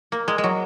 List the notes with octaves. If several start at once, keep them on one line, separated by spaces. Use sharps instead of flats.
A#3
G#3
G#3
F#3